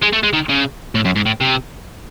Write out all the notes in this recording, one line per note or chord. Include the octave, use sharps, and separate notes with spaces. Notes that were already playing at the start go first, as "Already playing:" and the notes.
G#3
A3
G#3
D#3
C#3
A2
F#2
G#2
A2
C3